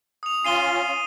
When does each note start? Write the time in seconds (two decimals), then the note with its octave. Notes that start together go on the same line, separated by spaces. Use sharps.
0.23 D#6 F7
0.45 C#4 F4 C7 D#7 G7